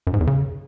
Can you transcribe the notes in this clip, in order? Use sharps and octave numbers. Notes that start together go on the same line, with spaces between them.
F#2
G#2
E2
C#3